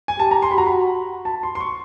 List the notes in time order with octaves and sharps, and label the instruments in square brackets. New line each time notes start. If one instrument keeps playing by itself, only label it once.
[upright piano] G#5
[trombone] G4 [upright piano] A5
[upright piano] A#5
C6
B5
[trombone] F#4 [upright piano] A#5
[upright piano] B5
A5
C6
C6
C#6